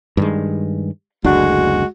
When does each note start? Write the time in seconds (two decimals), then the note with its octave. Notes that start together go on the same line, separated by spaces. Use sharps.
0.17 G2 D#3 G#3
1.24 F#1 D2 G#3 D4 F#4